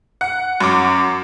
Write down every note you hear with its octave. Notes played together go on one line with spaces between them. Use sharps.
F#5
F#2 D6